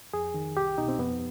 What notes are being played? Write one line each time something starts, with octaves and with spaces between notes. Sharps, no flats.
F2 G#4
D#3
C2 G4
B2 D#4
C4
F2 B3